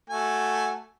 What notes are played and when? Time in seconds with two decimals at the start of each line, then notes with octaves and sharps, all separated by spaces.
0.10 A3 F#4 G#5